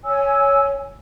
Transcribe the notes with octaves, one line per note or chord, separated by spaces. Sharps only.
C#5 G#5 E6